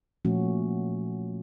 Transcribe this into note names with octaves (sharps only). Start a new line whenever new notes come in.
A#2 F3 A3 C#4 F#4